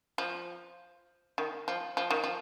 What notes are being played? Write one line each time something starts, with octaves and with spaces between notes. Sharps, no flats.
F3
D#3
F3
F3
D#3
F3